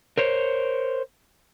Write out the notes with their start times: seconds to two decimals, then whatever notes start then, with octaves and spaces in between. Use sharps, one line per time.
0.18 A#4 C5 C#5